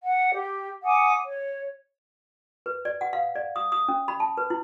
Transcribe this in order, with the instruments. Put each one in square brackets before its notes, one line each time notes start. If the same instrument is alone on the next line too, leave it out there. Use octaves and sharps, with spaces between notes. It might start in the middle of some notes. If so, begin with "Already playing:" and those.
[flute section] F#5
G4
F#5 G#5 D6 D#6
C#5
[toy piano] B4
D5
F#5
F5
D5
D#6
D#6
C#4
B5
A5
B4
E4